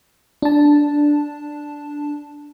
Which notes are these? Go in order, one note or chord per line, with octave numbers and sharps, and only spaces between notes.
D4 A5